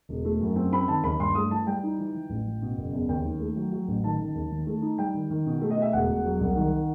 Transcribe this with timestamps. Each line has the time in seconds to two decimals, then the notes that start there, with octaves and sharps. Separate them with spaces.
0.09 E1
0.25 A3
0.41 F#2
0.56 C4
0.72 C4 B5
0.88 D#3 A5
1.03 D#2 B5
1.20 G2 C6
1.35 A3 D#6
1.51 E3 A5
1.67 G3 G5
1.83 D#4
1.98 E3
2.15 E3
2.30 A1
2.46 E3
2.62 B2
2.78 F#1
2.93 E2
3.09 D#2 G5
3.25 D#3
3.40 A3
3.56 F#3
3.72 F#3
3.88 A1
4.04 D#3 A5
4.20 D#3
4.35 D#2
4.51 D#3
4.67 A3
4.82 D#4
4.98 G3 G5
5.14 D#3
5.30 D#3
5.46 B2
5.62 A3
5.71 D#5
5.78 A3 E5
5.93 E1 F#5
6.09 E1
6.25 F#3
6.41 C2
6.56 D#3